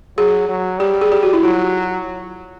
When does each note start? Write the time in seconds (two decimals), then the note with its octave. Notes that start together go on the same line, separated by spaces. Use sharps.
0.18 F#3 G#4
0.49 F#3
0.80 G3 G4
1.01 G#4
1.12 G4
1.23 F#4
1.33 E4
1.43 F#3 F4